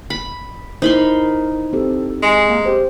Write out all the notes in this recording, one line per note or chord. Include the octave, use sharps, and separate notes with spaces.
B5
D#4 E4 A#4 C5 B5 C6
C4 G4 A4
G#3 G#5
A#3
G4 C5